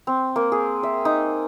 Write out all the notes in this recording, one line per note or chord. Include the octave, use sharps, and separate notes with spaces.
C4
A#3
G#4
E5
D#4